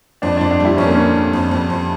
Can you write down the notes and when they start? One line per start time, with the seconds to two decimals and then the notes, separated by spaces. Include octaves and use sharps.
0.22 F2 D4
0.37 F2 D4
0.51 D4
0.60 G3 E4
0.77 F2 C#4
0.86 A#3
0.95 D3 C#4
1.15 D3
1.33 F2
1.51 F2
1.70 F2